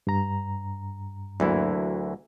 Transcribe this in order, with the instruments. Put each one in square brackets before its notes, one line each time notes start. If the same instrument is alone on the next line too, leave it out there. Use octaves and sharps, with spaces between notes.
[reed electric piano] G2 A#5
[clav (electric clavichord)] D2 E3 E4 [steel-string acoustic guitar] F#3 A#3